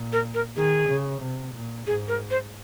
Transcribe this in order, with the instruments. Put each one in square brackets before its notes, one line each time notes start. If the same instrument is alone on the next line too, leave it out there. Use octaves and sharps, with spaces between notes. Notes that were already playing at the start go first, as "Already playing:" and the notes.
Already playing: [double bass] A#2
[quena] A#4
A#4
[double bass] D#3 [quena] G#4
[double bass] C#3
C3
A#2
[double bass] G#2 [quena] G#4
[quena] A#4
C5